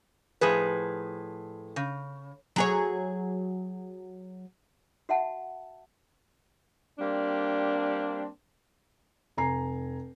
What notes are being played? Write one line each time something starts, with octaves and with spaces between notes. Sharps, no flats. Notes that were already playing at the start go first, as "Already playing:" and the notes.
A2 F3 G#4 B4
C#3
F#3 G#4 C#5
F#4 E5 F#5 A5
G3 A#3 C4 D4
F1 G#5 A#5 C7